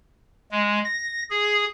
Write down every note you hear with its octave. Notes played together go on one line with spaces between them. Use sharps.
G#3
A#6
G#4